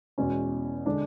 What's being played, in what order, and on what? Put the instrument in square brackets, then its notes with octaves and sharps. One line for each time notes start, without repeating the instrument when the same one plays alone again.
[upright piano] E2 B2 G#3 C#4
D3 G#3 D4